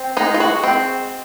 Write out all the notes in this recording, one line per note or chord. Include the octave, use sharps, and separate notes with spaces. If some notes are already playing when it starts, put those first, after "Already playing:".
Already playing: C4
G#3 D#4
F4
F#4
C4